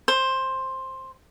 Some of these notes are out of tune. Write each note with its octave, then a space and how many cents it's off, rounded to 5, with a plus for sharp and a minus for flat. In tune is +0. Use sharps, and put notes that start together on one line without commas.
C5 +10